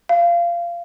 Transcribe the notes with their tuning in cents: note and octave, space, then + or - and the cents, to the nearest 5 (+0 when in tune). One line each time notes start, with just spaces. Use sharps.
F5 -20